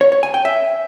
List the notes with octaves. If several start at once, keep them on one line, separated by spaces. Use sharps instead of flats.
C#5
C#5
G#5
G5
E5